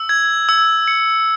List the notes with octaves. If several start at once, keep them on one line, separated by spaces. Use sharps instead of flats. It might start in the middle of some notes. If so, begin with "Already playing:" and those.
Already playing: E6
G#6
E6
C#7